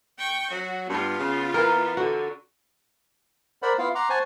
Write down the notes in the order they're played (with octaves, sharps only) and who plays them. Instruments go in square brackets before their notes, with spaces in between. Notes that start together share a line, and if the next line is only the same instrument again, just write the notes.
[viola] G5 C#6
[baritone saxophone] F#3 [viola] F#4
[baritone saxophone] G2 [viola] B3 F4
[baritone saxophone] C#3
[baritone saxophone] E3 [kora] A#4
[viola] D3 [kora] F#4
[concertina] A#4 C5 D5 F#5 B5
B3 E4 F4 F5
F#5 A#5 C6 D6
C5 F#5 G#5 A5 C#6